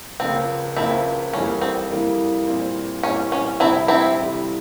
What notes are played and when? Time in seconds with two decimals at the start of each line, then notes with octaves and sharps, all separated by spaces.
0.20 C#2 C#3 F3 A#3 C4
0.76 C#2 C#3 F3 A#3 C4 E4
1.33 F2 E3 G3 A#3 C#4 E4
1.61 C4
1.90 F2 E3 G3 A#3 E4
2.47 A#2 G3 C4 E4
3.03 A#2 G3 C4 C#4 E4
3.32 C#4
3.60 F2 C3 E3 G3 C4 E4
3.88 C4 E4
4.16 F2 C3 E3 G3